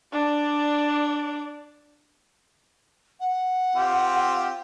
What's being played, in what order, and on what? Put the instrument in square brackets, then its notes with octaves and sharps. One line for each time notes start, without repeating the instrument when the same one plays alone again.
[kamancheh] D4 D5
[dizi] F#5
[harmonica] C4 F4 G4